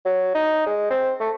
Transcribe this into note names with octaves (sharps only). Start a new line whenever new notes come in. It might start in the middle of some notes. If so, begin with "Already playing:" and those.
F#3
D#4
G#3
C4
A3